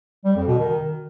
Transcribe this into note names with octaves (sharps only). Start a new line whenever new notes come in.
G3
F2
B2
D#3